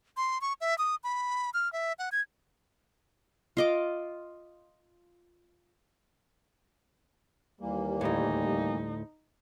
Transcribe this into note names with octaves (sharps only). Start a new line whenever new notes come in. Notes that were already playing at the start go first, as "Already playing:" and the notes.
C6
C#6
E5
D#6
B5
F6
E5
F#5
G#6
F4 D#5 D6
D#2 E3 G3 A#3
D2 A2 D#4